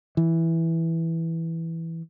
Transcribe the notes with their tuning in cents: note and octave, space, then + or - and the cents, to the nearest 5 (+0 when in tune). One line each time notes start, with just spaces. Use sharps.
E3 -5